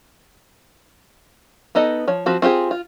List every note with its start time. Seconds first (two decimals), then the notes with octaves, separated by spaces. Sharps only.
1.75 B3 D#4 A4 D#5
2.07 F3 C#5
2.26 F3 C4 F#4
2.42 C4 F4 G4 G#4
2.71 F4